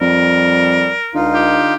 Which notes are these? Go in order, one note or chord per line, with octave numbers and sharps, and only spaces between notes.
F2 G3 A#4
C#2 D3 D#4 F4
G4